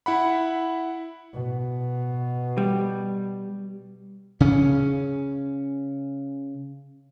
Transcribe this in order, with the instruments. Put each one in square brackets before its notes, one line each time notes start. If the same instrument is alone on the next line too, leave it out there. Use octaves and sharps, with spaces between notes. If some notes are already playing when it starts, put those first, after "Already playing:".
[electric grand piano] E4 F#5 B5
[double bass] B2
[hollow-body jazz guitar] G3
[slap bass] C#3 C#4